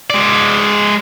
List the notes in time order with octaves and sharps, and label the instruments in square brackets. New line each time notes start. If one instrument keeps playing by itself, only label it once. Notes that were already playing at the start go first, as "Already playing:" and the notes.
[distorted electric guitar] G#3 D5